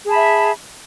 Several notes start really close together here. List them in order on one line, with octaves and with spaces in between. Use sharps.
G#4 A5 B5 E5